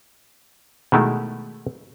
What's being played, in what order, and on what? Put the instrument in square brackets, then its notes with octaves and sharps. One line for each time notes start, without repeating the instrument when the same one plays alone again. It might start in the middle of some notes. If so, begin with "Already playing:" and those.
[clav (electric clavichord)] B2 D#3 G#3 A3 E4